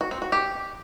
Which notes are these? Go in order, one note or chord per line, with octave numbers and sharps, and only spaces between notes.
F#4
C4
F#4
G4